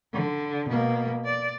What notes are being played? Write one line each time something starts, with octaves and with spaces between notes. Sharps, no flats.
D3
B2 A#3
D5